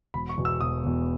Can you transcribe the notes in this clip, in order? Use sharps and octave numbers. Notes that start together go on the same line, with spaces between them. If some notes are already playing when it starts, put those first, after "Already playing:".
E1 B5
C#6
E2 B2
E6
E1 D#6
E2 B2